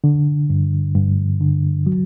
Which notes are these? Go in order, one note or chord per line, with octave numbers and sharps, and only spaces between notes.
D3
G2
G2
D3
F#3